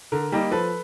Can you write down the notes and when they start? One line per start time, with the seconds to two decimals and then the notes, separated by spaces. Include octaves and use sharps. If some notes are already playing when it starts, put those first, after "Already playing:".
0.12 D3 A#4
0.32 G3 A#3 D#4
0.51 F3 A4 B4